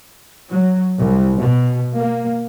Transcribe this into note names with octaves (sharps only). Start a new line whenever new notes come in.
F#3
C2
B2
A#3